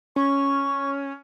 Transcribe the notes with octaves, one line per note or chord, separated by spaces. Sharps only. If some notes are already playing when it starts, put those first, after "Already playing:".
C#4 C#6